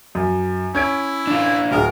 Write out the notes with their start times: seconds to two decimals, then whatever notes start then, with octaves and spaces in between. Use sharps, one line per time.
0.15 F#2
0.74 C#4 E4 G#6 D7
1.27 D4 F4
1.71 D1 G#4 A#4